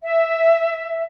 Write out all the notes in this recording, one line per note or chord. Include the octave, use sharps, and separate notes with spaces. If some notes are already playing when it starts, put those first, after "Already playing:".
E5